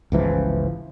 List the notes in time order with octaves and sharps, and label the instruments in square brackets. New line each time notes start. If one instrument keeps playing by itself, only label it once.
[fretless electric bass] G1 C#2 E3 F3